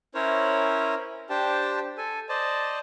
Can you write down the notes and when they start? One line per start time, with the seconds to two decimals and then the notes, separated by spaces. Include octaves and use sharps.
0.15 C#4 E4 A#4 C5 C#5
1.30 D4 G4 C5 G5 A5
1.98 A4 G#5
2.29 C5 D5 D#5 A5